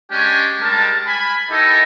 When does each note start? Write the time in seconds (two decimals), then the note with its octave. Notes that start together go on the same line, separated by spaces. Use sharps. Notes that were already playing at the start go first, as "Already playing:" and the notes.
0.11 G#3 C#4 D4 G4 G#5
0.62 G3 G#3 D4 A#4 A5
1.07 G#5 B5
1.51 D#4 E4 G4 A4 A#4 D#5